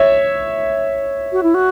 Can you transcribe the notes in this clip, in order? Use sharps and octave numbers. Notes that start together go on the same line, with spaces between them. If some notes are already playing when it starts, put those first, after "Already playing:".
Already playing: C#5 E5
F#4
E4
F#4